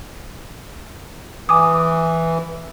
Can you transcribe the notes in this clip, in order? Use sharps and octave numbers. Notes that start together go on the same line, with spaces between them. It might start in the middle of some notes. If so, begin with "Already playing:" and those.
E3 G#5 D6 D#6